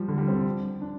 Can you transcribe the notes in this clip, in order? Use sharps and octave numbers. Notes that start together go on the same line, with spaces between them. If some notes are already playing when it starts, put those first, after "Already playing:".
Already playing: F3 G3
D3
G3
C4
D4